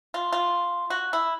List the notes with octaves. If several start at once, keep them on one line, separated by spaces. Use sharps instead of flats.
F4
F4
F#4
E4